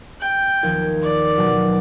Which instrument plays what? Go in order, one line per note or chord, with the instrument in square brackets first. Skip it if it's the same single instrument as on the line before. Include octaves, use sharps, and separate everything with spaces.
[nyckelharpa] G5
[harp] D#2 F3 G#6
[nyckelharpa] D5
[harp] B2 F#3